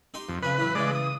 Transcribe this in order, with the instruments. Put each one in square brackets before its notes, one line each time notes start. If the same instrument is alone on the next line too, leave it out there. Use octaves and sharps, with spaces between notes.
[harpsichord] D#4 G4 C6
[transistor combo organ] F2
[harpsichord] F2 C#3 G#5 [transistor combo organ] B4
[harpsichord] A2 E3 F#3
[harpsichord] C#3 E3 [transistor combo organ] G#3 D5
[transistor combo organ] D#6